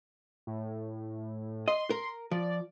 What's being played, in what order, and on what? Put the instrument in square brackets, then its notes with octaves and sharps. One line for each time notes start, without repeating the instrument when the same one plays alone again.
[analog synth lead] A2
[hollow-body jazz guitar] D#5 [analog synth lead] C6
[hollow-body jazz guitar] A#4
[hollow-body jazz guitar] F3 [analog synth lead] D5